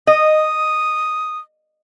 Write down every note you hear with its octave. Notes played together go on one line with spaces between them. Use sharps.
D#5 D#6